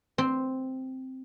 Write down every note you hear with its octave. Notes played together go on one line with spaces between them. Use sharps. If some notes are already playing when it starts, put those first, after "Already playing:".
C4